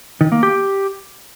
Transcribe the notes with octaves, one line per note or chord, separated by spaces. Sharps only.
D#3
A#3
G4